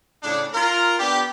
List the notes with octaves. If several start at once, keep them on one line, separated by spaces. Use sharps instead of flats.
A2 C#3 D4
F4 A#4
B3 D4 G4